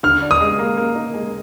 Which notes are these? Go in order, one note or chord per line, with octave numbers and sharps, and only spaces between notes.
D3 F6
D4
D#6
G#3
A#3
A#3
D#4
G#3